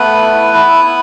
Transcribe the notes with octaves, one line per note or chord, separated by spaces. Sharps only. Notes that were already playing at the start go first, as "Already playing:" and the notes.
Already playing: A3 B3 B4
E4
E4
E4